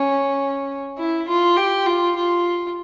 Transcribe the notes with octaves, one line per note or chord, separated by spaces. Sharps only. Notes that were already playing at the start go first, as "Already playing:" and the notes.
Already playing: C#4
E4
F4
G4
F4
F4